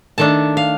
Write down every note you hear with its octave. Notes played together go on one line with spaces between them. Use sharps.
D#3 A3 D4 A5
F5